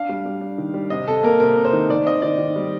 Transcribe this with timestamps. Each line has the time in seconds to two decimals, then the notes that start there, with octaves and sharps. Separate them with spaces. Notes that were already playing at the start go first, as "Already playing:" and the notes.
Already playing: D4 F5
0.09 G3
0.26 G3
0.41 D4
0.58 D#3
0.74 G3
0.90 C3 D#5
1.08 C3 A4
1.23 A#3 A#4
1.40 C3 A#4
1.57 C3
1.65 C5
1.73 D#3
1.89 D#3 D5
2.06 C4 D#5
2.22 D#3 D5
2.39 D#3
2.56 G3